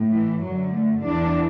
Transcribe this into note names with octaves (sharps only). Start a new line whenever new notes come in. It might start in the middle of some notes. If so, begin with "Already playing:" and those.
Already playing: A2
E3
F#2 D3 F#3
A3
E2 E3 D4